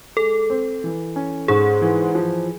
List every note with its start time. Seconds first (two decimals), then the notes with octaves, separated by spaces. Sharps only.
0.17 G#3 A4
0.50 C4
0.84 E3
1.16 C#4
1.48 G#2 G#4
1.82 E3
2.15 F3